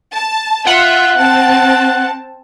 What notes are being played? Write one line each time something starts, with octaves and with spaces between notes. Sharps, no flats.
A5
F4 E5 F#5
C4 A5